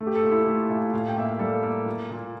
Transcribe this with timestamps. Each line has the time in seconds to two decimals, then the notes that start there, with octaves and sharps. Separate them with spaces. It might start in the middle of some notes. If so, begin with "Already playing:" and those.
0.01 A3
0.07 G4
0.15 A4
0.24 A#2
0.32 E4
0.47 A3 F4
0.70 A#2 E5
0.93 A2 F5
1.08 G5
1.16 A#3 E5
1.24 F5
1.39 G3 A4
1.63 A#3
1.86 A#2
2.10 A#2